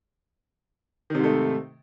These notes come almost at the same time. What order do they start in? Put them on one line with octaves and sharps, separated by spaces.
D#3 C3 G#2 A3